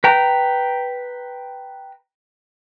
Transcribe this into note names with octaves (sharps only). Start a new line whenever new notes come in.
B4 G5 A#5